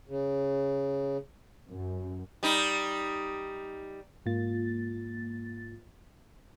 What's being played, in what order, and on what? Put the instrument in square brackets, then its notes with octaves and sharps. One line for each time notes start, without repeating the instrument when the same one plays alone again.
[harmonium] C#3
[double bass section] F#2
[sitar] G3 D#4
[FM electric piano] G#2 A#3 F4 A6